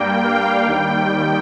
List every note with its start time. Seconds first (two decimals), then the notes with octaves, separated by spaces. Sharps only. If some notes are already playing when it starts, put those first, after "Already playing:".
Already playing: G2 G3 A#3 G5
0.24 F5
0.65 D#2 D#3 G3 G5